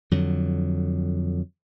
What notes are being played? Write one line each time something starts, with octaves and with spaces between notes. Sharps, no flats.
F2 D3 F#3